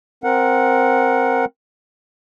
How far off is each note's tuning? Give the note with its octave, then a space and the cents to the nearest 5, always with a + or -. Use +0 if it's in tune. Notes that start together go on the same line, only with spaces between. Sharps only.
C4 +0 A#4 +0 F#5 -10